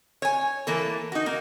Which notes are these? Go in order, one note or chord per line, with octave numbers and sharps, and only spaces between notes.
C#5 G#5
E3 A#3 A4
D#4 F#4
A#3